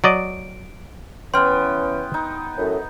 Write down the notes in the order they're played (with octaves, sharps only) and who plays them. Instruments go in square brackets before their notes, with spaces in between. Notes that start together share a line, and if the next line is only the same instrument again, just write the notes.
[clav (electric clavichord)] F#3 D5 D#5 [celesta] D7
[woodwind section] E3 C#4 [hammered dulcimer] B3 G5 [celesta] C6 F6
[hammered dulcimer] D#4
[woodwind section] F#2 A2